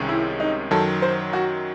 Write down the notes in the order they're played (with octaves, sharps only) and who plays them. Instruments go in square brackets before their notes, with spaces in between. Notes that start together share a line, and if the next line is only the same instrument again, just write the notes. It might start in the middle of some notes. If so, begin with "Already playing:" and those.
Already playing: [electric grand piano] C2 C3 D#3 G#3 C#4
[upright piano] E4
D#4
[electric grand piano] F#2 D#3 F#3 [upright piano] A4
[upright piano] C5
F#4